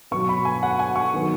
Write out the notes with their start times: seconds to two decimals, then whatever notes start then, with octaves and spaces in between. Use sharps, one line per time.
0.11 B2 F#3 B3 C#6
0.29 B5
0.45 G#5
0.63 F#5
0.79 G#5
0.96 C#6
1.14 D#3 F#3 B3